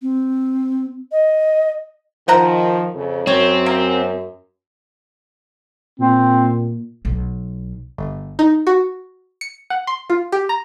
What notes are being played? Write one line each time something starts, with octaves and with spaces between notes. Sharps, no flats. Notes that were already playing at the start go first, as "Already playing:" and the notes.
C4
D#5
D#3 F3 C5 F#5 A#5
F2 C#3
F#2 C4 C#5
A#3
A#2 C4
B1
G1
D#4
F#4
C#7
F#5
C6
F4
G4
A#5